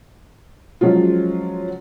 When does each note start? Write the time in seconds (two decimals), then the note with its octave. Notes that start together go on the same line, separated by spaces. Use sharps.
0.81 F3 F#3 G#3 C#4 F4